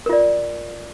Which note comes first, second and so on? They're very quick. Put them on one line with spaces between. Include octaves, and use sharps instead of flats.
A#4 F4 D5